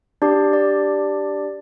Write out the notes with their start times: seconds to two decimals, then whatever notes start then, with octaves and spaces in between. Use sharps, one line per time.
0.22 D4 G4 D5
0.53 D5